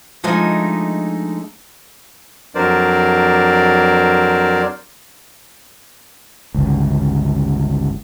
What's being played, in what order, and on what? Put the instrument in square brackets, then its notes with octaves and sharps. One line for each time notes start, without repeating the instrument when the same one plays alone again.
[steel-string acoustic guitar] F3 G#3 A3 D4 D#4
[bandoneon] F2 F#3 D4 A#4 C5 D5
[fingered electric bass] G1 C#2